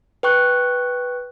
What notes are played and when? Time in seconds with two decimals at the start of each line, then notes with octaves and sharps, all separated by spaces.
0.23 B4 G5 C#6 F#6